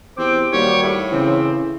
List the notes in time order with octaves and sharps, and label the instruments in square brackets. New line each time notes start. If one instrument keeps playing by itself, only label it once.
[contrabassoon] E2 [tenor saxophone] C4 [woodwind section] G4 C5 D6
[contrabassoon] D#2 [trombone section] G3 A#3 F#4 [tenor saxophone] C#5
[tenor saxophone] A2
[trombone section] C#3 [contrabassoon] E3 [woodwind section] C4